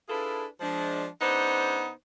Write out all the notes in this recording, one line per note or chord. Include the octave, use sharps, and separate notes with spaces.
D4 E4 F4 G#4 A4 B4
F3 G#3 D4
C#3 B3 D4 D#4 C5